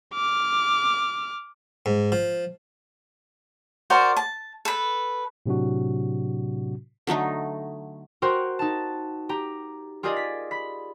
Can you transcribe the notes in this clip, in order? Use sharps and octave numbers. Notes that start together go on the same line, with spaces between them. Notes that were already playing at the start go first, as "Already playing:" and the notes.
D6 F6
G#2
F3
F#4 A#4 C5 D5
A5
A4 B4
A2 C3 F#3 D4 F#4
D3 F#3 A3 D#4
F#4 A#4 C5 G5 C6 C#6
D#4 A5
G4 A#5
F4 G4 G#4 A#4 D5 D#5
B6
B5 B6